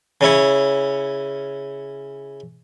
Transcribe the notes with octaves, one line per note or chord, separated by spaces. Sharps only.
C#3 C#4 E4 C#5